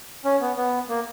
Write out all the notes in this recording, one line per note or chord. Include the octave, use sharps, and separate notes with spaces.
C#4
B3
B3
A#3